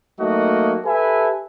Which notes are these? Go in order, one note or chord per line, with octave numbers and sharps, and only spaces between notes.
F#3 A3 A#3 D#4 F#4 D#5
G4 A4 B4 E5 G#5